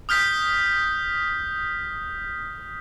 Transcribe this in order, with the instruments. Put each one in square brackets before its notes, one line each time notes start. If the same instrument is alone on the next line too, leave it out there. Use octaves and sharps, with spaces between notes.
[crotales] D#6 F6 G6 B6